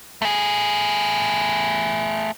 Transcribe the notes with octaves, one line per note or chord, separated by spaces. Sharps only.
A3 G#4